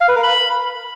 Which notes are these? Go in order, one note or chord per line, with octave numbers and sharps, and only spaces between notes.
F5
B4
A#4
B5